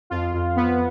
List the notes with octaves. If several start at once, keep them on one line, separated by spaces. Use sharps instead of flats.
F2 F4
F2
B3